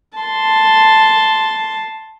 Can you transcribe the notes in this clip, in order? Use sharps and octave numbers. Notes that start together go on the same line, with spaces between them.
A5 C6